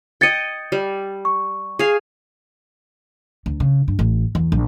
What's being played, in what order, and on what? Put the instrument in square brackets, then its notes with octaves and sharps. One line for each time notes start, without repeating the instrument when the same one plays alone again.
[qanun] D#5 G5 [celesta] G#6 A6 C#7
[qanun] G3
[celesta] C#6
[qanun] G#4 F5
[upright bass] D2
C#3
G2
A1
E2
A#1